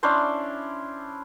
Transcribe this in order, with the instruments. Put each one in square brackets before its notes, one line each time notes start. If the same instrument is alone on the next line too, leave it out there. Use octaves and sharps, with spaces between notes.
[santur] C#4 D4 E4 C5